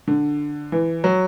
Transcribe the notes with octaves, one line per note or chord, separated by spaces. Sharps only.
D3
E3
F#3